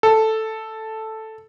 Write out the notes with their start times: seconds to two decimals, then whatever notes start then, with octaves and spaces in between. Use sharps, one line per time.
0.03 A4